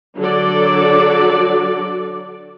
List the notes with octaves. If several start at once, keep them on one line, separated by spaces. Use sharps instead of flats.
D3 F#3 F#4 A4 D5